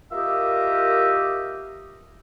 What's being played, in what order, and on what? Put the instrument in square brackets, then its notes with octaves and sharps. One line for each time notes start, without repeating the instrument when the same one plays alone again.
[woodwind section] A#3 F4 G4 A#4 D#5 E5